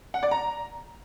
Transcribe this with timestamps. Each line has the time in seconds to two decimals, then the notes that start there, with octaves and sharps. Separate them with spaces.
0.14 F#5
0.23 D5
0.31 A#5